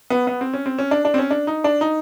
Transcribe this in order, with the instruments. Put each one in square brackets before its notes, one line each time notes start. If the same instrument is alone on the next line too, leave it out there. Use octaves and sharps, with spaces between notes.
[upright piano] B3
B3
C4
C#4
C4
C#4
D4
D4
C4
C#4
D4
D#4
D4
D#4